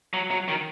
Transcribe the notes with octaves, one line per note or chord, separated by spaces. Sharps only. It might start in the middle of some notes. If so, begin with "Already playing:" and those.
F#3
F#3
D#3